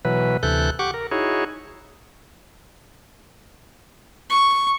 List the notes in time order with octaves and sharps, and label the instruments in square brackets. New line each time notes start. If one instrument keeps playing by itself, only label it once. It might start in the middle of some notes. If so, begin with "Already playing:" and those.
[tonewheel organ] B2 E3 F#3 B4
D2 C3 E3 A4 F#6 G6
G4 F#5 C#6 D6
A#4
D#4 E4 F#4 G#4 C#5
[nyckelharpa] C#6